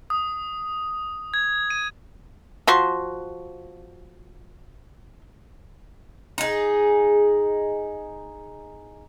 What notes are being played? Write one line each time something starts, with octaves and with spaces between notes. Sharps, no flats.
D#6
G#6
D#7
F3 F#4 C6
D#4 G#4